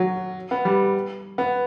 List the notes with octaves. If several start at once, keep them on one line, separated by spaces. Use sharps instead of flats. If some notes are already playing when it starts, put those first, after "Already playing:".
Already playing: F#3
B3
G3
B3